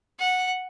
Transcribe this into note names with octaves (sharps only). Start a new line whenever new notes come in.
F#5